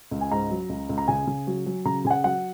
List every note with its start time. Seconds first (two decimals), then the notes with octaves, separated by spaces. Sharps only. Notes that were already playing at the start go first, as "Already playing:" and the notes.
0.11 C#2
0.21 G#5
0.31 G#2 A#5
0.51 F#3
0.69 C#2
0.89 C#2
0.98 A#5
1.08 C#3 G#5
1.27 C#3
1.47 F#3
1.66 F#3
1.85 C#3 A#5
2.05 C#3 G#5
2.11 F#5
2.24 F#3 F#5